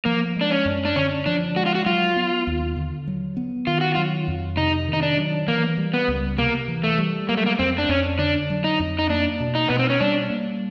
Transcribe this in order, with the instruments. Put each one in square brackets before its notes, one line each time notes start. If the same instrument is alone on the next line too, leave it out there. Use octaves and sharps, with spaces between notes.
[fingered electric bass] F3 [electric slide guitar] A#3
[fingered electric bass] G#3 [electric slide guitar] D4
[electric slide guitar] C#4
[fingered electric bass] F#2
[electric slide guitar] D4
[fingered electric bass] D3 [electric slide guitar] C#4
[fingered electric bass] F3 [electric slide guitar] D4
[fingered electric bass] G#3 [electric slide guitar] F#4
[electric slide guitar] F4
F#4
[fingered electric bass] F#3 [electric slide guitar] F4
[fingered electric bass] B3
D#2
D3
F#3
B3
[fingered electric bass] D#3 [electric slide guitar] F4
[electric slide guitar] F#4
[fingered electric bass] F#3 [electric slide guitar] F4
[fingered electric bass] F2
[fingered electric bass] C3 [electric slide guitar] D#4
[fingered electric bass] D#3 [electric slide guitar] D#4
[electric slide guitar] D4
[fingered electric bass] F#3
[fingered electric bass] E3 [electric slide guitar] A#3
[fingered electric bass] G3
[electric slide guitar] B3
[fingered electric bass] C#2
[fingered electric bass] C3 [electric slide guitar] A#3
[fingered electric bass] E3
[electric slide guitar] A3
[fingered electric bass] G3
[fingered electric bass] F#3 [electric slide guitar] A#3
[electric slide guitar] A3
A#3
[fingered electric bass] F2 [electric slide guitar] C4
[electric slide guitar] D4
[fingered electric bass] F2 [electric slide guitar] C#4
[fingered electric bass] D3 [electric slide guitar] D4
[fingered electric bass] F#3
[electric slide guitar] D#4
[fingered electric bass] F2
[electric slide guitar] D#4
[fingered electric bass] A#3 [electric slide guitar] D4
[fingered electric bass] B2
[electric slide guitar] D#4
[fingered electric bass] B2 [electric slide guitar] B3
[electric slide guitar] C4
C#4
[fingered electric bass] G3 [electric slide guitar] D4
[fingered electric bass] A#3